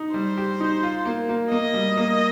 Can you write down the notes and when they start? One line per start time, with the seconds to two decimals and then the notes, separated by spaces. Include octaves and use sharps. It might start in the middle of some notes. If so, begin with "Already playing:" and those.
Already playing: D#4
0.14 G3 C5
0.37 G4
0.60 D#4
0.83 F4
1.05 A#3
1.29 A#3
1.52 A#3 D#5
1.74 G3
1.97 A#3